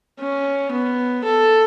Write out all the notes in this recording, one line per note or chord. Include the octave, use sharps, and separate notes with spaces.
C#4
B3
A4